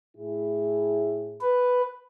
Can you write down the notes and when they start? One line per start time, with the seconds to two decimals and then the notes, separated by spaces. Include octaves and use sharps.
0.18 A2 E4 G#4
1.41 B4